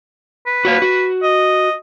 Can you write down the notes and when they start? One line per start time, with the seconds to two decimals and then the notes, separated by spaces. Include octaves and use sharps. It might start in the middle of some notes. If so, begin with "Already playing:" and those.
0.47 B4
0.65 F#4 C#5 F5
0.82 F#4
1.22 D#5